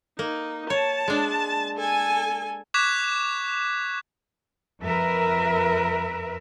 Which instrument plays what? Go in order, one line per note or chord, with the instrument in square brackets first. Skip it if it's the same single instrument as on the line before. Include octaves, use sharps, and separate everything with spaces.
[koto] A#3 [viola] D#4
[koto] C#5 [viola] A5
[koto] G#3 D4
[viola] A4 G#5
[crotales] C#6 D6 F#6 G#6 B6 E7
[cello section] F2 A#4 B4 E5